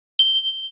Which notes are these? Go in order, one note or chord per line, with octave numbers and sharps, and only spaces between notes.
G7